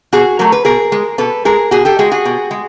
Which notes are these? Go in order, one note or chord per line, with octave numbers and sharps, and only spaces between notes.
B2 F#4 G#4
F#3 A3 A#4
B4
B2 G#4 A#4
G#3
B2 A4 B4
G#3 G#4 A#4
B2 F#4 G#4
G4 A4
G#3 F#4 G#4
F#4 G#4
B2
G#3